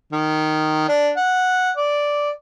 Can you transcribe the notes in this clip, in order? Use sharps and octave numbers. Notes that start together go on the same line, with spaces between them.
D#3
D4
F#5
D5